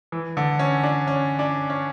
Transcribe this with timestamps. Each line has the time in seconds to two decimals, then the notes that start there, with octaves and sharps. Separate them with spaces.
0.12 E3
0.37 D3
0.59 C#4
0.83 D4
1.07 C#4
1.39 D4
1.70 C#4